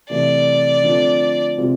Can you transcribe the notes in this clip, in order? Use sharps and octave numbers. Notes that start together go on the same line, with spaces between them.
C3 E3 A3 D5
D3 F3 A3 C4
C3 G#3 C4 F4